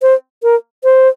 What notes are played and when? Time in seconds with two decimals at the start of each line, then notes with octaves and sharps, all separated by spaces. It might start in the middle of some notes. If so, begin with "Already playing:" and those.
0.02 C5
0.43 A#4
0.84 C5